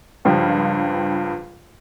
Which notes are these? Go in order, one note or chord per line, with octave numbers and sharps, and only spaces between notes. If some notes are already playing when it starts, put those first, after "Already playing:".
C#2 G2 F3 F4 G4